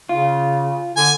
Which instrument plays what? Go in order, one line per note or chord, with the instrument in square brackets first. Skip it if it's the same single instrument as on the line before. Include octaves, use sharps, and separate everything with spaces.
[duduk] C#3 [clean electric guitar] F4
[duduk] D3 [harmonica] G#5